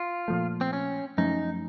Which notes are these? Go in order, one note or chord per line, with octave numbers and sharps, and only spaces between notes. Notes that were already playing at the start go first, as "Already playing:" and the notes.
Already playing: F4
A#2 F3 A3
C4
C#4
F#2 F3 A3 C#4 D#4